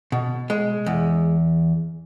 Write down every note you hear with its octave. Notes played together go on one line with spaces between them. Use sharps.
B2
G#3
E2